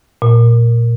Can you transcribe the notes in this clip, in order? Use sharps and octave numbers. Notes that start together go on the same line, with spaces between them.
A#2